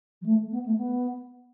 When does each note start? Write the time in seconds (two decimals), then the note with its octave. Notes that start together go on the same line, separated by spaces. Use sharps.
0.21 F#3
0.26 A3
0.51 B3
0.66 A3
0.76 B3